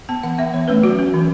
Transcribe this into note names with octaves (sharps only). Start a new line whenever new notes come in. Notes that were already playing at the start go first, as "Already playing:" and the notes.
B3 A5
E3 F#5
B3 E5
E3 C#5
A3 C#4 B4
F#3 F#4
C#4
E3